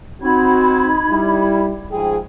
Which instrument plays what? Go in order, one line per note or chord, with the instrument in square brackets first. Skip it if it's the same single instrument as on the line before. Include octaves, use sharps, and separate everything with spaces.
[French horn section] C4 F#4 [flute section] D#4 B5 G#6
[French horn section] G3 E4
[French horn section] G#2 F3 G#4 [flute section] G5